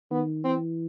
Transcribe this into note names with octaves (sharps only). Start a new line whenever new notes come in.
D#3 B3
E3 C4